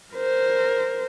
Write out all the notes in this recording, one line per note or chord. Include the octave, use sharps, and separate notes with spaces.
A#4 C5